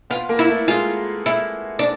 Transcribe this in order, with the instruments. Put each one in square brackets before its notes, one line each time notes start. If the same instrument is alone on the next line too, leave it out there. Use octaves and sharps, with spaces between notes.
[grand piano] B3 B4 [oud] F4
[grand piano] A#3 A#4
[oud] E4
[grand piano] A3 A4
[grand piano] G#3 G#4 [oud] F4
[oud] E4
D4